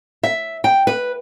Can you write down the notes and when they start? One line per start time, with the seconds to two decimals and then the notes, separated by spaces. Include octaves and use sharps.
0.23 E5
0.64 G5
0.87 B4